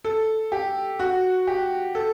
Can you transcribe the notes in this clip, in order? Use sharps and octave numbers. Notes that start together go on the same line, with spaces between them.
A4
G4
F#4
G4
A4